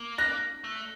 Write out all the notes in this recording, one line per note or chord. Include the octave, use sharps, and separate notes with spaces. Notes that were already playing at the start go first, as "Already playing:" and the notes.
Already playing: A#3
F#6 A#6
A3